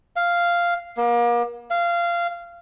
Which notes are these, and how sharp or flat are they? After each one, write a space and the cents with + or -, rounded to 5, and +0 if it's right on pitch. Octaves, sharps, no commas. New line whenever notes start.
F5 -5
A#3 +35
F5 -20